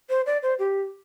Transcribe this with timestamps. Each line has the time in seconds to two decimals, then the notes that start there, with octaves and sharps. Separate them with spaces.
0.10 C5
0.26 D5
0.43 C5
0.59 G4